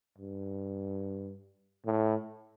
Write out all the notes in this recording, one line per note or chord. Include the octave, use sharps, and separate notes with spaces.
G2
A2